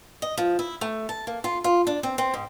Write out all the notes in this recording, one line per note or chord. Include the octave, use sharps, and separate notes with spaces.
D#5
F3
E4
A3
A5
A#3
F4
F4
D4
C4
C4
G#2